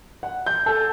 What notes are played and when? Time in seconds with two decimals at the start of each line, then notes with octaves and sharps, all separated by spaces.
0.23 F#5
0.46 G6
0.66 A4